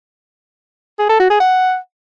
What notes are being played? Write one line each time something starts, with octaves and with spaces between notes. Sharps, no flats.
G#4
A4
F#4
G#4
F#5